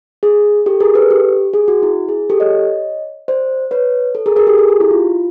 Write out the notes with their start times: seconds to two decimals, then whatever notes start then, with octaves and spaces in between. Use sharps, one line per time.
0.23 G#4
0.66 G4 A4
0.80 G#4 A#4
0.95 A4 B4
1.11 G4
1.53 G#4
1.68 F#4
1.83 E4
2.08 G#4
2.30 G4 A4
2.40 C#5 D#5
3.28 C5 D5
3.71 B4 C#5
4.15 A4
4.26 G#4 A#4
4.36 G#4 A#4
4.47 G4 A4
4.58 G#4
4.69 G4
4.80 E4
4.91 F4